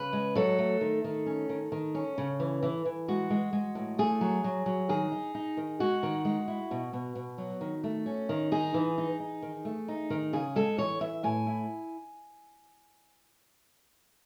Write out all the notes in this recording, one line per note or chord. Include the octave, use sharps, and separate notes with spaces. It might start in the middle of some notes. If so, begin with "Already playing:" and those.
Already playing: C#3 B4
G#3
F#3 A4
A3
D#3
D#3
C#4
D#3
D#3
C#4
C#3
E3
E3
E3
G#3 F#4
G#3
G#3
A2
A3 G#4
F#3
F#3
F#3
D#3 G#4
D#4
D#4
D#3
G#3 F#4
D#3
G#3
E4
B2
B2
B2
F#3
D#3
A3
C#4
D#3
D#4 G#4
E3
D#4
D#4
D#3
A3
D#4
D#3
C#3 G#4
G#3 A4
E3 C#5
E3 E5
A2 G#5
E4